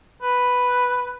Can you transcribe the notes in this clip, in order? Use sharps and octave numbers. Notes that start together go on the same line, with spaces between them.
B4